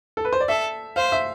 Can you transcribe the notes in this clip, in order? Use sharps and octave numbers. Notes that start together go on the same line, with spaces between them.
A4
B4
C5
D5
A4 E5
C5 F5
E5